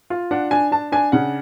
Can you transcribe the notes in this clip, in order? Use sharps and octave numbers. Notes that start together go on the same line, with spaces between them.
F4
D4 F#5
D4 G#5
D4 A5
D4 G#5
C#3 F#5